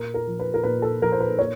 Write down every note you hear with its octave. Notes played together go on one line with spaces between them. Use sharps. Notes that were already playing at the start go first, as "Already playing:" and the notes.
Already playing: A#2 A#4
A#4
F3
B4
A#4
A#2 B4
A4
F3 A#4
C5
B4
A#2 C#5